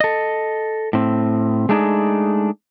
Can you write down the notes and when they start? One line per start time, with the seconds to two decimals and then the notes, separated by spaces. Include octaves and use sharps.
0.01 A4 D#5
0.93 A2 C4
1.69 G#3 A3 D4 D#4 G#4